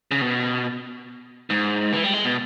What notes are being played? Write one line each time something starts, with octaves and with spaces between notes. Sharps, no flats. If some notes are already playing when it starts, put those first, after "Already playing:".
C#3
B2
G#2
E3
G3
G#3
B2